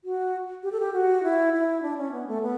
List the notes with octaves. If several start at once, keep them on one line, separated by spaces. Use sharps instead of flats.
F#4
G4
A4
G4
F#4
E4
E4
D4
C#4
B3
A3
B3